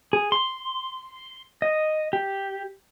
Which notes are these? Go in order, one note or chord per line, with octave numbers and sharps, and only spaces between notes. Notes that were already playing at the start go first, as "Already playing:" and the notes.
G#4
C6
D#5
G4